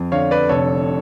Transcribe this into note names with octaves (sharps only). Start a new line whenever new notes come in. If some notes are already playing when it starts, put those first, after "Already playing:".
Already playing: F2
D3 C#5 F5
B4 D5
F1 A4 C#5